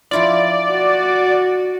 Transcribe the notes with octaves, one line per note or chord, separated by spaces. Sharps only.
F3 E4 F4 D5
F#4